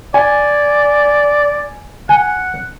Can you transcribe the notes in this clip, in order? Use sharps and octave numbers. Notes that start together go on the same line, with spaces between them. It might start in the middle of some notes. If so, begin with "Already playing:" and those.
D5 G#5
F#5 G#5